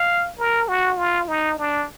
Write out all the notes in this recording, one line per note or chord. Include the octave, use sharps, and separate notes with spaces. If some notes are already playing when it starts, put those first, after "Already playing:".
Already playing: F5
A#4
F#4
F4
D#4
D4